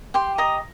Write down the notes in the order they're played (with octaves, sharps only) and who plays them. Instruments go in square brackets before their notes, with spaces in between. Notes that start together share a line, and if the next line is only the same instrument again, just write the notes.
[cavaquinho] G4 G5 C6
D#5 A#5 D#6